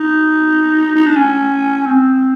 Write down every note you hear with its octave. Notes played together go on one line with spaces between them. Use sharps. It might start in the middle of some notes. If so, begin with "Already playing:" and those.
Already playing: D#4
D#4
D4
C#4
C4